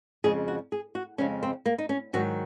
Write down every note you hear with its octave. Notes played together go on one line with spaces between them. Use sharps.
F2 C#3 F3 G#3 G#4
F#4
G#4
F#4
F2 C#3 F3 G#3 C#4
C4
A#3
D#4
C#4
G#2 D#3 F#3 F#4